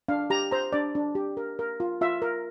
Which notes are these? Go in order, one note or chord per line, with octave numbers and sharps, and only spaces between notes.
D4 F5
G4 A#5
C5 A#5
D4 D5
D4
G4
A#4
A#4
F4
F4 E5
A#4